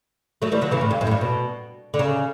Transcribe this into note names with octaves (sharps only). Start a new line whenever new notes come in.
F#3 A3
E3 G3
D3 F#3
C#3 E3
A2
G2
F#2
A2
G2
B2
D3
C#3